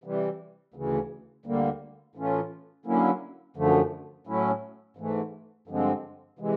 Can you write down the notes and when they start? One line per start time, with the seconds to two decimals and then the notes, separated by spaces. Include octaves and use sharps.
0.04 C3 E3 G3
0.74 D2 C#3 E3
1.46 D2 D3 G3 A#3
2.15 A2 E3 A3 C#4 F4
2.85 D3 F#3 A#3 C#4 E4
3.56 F#2 D3 F3 A3
4.27 A2 F#3 A3 C#4 E4
4.97 G#2 E3 A3
5.67 G2 D3 F3 G#3 C4
6.39 C3 E3 G#3